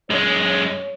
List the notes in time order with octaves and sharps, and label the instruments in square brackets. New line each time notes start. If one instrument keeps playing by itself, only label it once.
[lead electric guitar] F#2 G#3 [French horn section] C#5